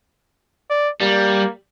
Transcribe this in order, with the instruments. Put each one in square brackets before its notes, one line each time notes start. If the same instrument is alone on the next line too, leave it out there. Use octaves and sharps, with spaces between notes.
[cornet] D5
[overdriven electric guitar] G3 [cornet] A#3